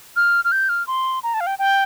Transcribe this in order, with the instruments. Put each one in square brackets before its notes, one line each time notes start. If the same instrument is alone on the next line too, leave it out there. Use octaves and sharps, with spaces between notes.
[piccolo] F6
F6
G6
F6
C6
A#5
A5
F5
G5
G5